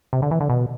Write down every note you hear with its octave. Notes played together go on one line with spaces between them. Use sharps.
C3
D3
E3
D3
B2